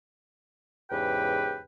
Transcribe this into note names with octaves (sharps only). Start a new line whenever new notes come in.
E2 G#2 C#3 G4 B4 G5